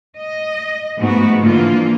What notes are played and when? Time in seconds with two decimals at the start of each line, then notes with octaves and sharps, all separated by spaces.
0.18 D#5
0.99 G#2 F3 A3 B3 F#4
1.43 D3 E3 F3 A#3 F4